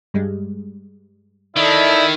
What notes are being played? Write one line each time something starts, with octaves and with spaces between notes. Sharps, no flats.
G2 G3 G#3
D#3 E4 A4 D5 E5